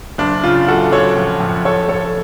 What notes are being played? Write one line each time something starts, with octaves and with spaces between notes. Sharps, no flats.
F#1 D4
C#3 F4
F#1 F#4 A4
F#1 A4 C#5
F2
F2
F2 A4 C#5
F2 A4 C#5